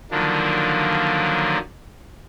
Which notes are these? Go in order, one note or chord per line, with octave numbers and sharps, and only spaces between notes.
D3 D#3 F3 F#3 A#3 D4